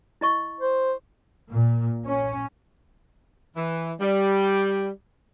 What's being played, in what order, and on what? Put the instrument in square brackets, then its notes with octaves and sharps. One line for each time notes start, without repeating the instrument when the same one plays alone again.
[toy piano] E4 D#5 C#6
[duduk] C5
[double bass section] A#2
C#4
[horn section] E3
G3